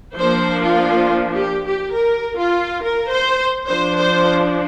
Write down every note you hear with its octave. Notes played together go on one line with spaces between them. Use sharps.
F3 A#3 D4 C5
F4
G4
G4
A#4
F4
A#4
C5
F3 D4 C5
C5